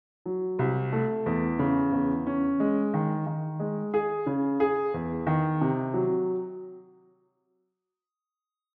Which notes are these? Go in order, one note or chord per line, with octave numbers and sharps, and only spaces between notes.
F#3
C2
A3
E2
C#3
E2
C#4
G#3
D#3
D#3
G#3
G#4
C#3
G#4
E2
D#3
C3
F#3